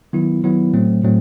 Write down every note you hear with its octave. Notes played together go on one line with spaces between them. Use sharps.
D#3 F#3 B3 E4
D#3 F#3 B3 E4
A2 F#3 A3 C4
A2 F#3 A3 C4